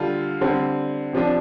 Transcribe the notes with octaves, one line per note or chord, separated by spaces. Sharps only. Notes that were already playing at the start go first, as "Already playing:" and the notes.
Already playing: D3 G3 F4 A4
D3 G3 C4
C3 F3 D4